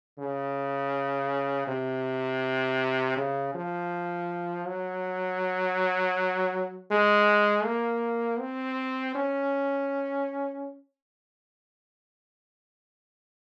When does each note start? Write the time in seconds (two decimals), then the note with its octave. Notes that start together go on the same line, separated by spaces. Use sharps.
0.18 C#3
1.67 C3
3.17 C#3
3.54 F3
4.66 F#3
6.91 G#3
7.65 A#3
8.40 C4
9.15 C#4